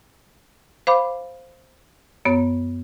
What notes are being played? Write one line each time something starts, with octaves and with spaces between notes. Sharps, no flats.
C5 F5 B5 D6
F#2 B3 C#5